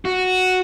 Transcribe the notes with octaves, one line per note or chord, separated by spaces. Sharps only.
F#4